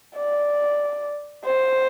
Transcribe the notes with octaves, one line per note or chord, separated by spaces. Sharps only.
D5
C5